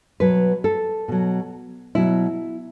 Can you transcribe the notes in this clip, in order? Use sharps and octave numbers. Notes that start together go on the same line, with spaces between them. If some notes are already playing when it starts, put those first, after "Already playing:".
B2 F#3 B4
A4
B2 F#3
B2 F#3 E4